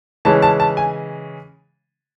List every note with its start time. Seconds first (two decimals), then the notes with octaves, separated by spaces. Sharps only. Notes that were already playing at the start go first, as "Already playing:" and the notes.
0.25 C#3 E3 G#3 C#4 A5
0.42 A5
0.60 A5
0.77 G#5